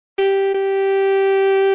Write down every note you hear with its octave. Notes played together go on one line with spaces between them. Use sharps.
G4
G4